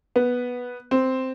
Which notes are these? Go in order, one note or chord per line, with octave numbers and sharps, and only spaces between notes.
B3
C4